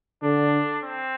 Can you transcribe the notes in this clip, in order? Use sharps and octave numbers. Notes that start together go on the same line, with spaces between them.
D3 D4
C4